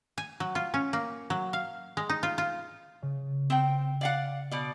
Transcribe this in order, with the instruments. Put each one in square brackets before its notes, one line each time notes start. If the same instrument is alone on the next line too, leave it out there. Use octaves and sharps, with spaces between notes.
[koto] G#5
F#3
F4
C#4
A#3
F#3
F5
G#3
D#4
F4
F4
[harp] C#3
[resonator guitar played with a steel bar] C4 G5
D5 F5 F#5
B2 D5